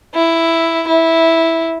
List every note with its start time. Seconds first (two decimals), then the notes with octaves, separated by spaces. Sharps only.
0.15 E4
0.88 E4